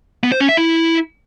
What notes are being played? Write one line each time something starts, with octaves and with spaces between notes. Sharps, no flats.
B3
C5
C#4
E5
E4